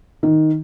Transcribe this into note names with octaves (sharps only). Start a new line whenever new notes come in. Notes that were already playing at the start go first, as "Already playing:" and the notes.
D#3